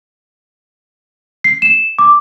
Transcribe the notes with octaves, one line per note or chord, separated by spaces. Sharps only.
C7
E7
D6